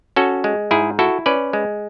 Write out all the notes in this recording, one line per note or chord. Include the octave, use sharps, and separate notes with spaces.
C#4 F#4 A4
G#3
G#2 E4 G#4
E4 F#4 A4
C#4 B4 D5
G#3